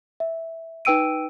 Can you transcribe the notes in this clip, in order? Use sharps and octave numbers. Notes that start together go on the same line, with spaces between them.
E5
D#4 B4 G5 E6 D7 D#7